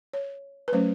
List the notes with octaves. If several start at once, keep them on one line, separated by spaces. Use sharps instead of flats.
C#5
B4
F#3 A3 C#4 C5